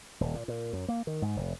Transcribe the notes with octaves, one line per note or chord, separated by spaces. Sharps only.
D#1
A#2
A#2
F#2
A#3
D#3
G#2
F1